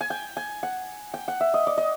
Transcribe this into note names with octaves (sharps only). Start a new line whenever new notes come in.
G#5
G5
G#5
F#5
G5
F#5
E5
D#5
D5
D#5